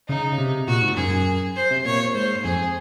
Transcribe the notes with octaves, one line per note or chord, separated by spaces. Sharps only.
C#3 D#4
C3
A#2 F#4
G#2
F#2 G#4
C5
C3
A#2 C#5
G#2 C5
F2 G#4